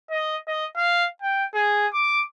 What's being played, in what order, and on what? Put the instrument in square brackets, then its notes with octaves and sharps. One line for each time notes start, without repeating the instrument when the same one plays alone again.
[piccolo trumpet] D#5
D#5
F5
G5
G#4
D6